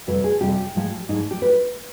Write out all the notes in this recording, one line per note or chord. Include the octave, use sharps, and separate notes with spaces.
F2 C3 G3 B4
G#4
F2 C3 G3 G4
G#2 F3 G#3
G#2 F3 G#3 D#4
G4
B4